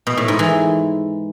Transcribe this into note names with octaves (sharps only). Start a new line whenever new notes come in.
B2
A2
G#2
E3